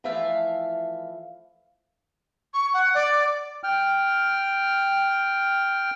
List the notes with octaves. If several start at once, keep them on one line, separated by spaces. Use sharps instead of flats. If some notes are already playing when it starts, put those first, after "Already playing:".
E3 F3 A3 E5 F5
C#6
F#5
D5
G5 F6